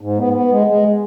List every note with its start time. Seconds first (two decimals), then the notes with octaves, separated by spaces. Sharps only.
0.01 G#2
0.18 B3
0.33 B3
0.51 G#3
0.67 G#3